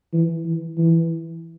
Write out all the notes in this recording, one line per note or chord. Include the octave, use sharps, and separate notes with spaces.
E3
E3
E3